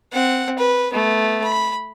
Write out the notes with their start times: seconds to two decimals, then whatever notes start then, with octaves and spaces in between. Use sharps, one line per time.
0.12 C4 F#5
0.58 B4
0.93 A3 B3
1.44 B5